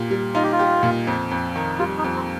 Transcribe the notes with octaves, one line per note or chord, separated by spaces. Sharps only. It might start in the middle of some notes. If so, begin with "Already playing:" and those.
Already playing: A#2 G4
G3
D#4 F4
G4
F4
G4
A#2
F2
F2
D#3
G3 F4
D#4
F2
C4